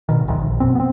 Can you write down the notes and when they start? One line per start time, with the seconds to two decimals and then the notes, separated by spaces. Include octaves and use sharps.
0.09 G#1 B2 D#3
0.28 G1 D2 D#3
0.40 A#1
0.60 F#2 B2 C4
0.75 B3 C4